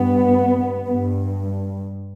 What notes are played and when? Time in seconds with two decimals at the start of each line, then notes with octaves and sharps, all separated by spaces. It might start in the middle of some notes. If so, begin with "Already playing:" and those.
Already playing: G2 B3
0.88 G2